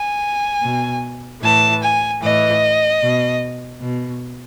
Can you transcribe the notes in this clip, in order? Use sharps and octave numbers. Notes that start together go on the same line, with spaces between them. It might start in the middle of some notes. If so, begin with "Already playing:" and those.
Already playing: G#5
B2
A2 E3 A5
G#5
A2 E3 D#5
B2
B2